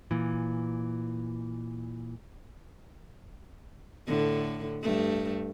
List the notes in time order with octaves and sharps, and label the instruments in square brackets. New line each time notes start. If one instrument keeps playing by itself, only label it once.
[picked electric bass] A#2 E3
[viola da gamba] A2 D3
G2 A3